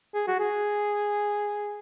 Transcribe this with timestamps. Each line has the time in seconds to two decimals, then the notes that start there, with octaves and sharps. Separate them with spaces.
0.14 G#4
0.28 F#4
0.40 G#4